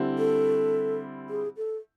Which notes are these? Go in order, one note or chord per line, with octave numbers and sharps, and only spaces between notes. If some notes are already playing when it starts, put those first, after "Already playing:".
Already playing: D3 G3 C4 E4
A4
G#4
A4